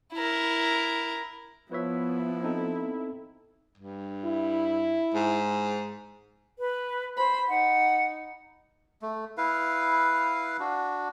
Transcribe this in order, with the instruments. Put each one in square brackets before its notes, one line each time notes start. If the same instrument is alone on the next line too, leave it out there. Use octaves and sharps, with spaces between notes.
[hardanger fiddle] E4 A#4
[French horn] F3 [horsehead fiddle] B3 [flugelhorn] E4 [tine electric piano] B4 C#5 E5
[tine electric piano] C4 D#4 A4
[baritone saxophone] G2
[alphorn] E4
[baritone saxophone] G#2
[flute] B4
[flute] C5 [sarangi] B5
[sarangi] D#4 [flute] F#5
[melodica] A3
E4 B4 F5
D4 F#4